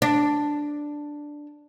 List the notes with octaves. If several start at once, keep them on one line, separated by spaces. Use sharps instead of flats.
D4